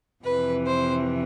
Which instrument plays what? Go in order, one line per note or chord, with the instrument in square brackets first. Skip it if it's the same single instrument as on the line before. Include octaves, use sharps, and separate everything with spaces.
[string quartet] F2 C3 E3 B4
C5